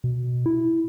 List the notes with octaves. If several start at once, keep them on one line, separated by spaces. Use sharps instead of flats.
B2
E4